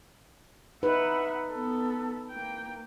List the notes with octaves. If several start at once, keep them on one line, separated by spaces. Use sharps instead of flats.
D#4 B4 E5 F#5
B3 A4
A#3 G5